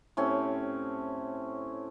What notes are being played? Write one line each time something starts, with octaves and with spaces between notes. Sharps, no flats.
A2 C4 C#4 G4